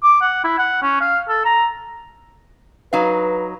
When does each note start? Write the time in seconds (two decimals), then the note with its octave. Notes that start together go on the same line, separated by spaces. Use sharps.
0.03 D6
0.22 F#5
0.44 E4
0.58 F#5
0.83 C#4
1.01 F5
1.29 A4
1.45 A#5
2.93 F#3 D#4 B4 F5